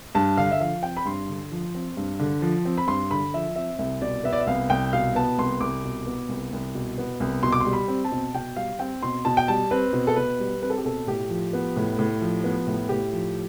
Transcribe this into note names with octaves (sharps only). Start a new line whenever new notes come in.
G2 A5
D3 F5
E5
F3 F5
C4 G5
B5
G2 C6
D3
F3
C4
G2
D3
F3
C4
B5
G2 C6
D3 B5
F3 E5
C4 E5
C2 E5
B2 D5
B3 E5
D5
E5
C2 F5
C2 G5
B2 F5
B3 A5
C2 C6
C2 D6
B2
B3
C2
C2
B2
B3
C2
B2 C6
D6
C6
G3
B5
C4
A5
B2
B2 G5
G3 F5
C4 G5
B2 C6
B2 A5
G5
G3 A5
C4 B4
B2
A4
B2 B4
G3
C4 B4
A4
G4
B2 A4
A2 G4
F3
B3
A2
A2
F3
B3
A2
A2 G4
F3